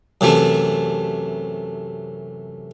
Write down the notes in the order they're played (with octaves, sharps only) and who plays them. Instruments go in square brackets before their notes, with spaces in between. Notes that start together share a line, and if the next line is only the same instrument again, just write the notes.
[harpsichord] F#2 C3 E3 A3